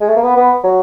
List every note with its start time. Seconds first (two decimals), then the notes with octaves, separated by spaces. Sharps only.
0.01 G#3
0.09 A3
0.16 A#3
0.23 B3
0.37 B3
0.64 F#3